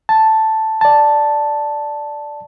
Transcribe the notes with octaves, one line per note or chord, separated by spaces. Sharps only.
A5
D5 A5